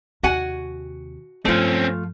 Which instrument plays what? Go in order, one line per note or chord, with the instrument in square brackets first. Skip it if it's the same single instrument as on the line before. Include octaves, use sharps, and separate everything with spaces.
[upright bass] D#2 C3 [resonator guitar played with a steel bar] F#4 F#5 G#5
[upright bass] G2 F3 [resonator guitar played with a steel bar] A3 F4 [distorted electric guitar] C4 C#4